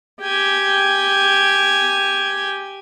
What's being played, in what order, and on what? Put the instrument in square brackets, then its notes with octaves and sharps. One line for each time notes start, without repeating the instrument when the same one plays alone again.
[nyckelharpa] G4 G#5